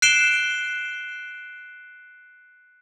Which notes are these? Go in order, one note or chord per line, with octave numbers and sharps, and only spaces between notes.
F#6 C7 D7 E7 G7